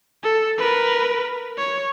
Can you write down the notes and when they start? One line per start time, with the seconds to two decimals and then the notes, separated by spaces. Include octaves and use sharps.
0.23 A4
0.58 A#4 B4
1.57 C#5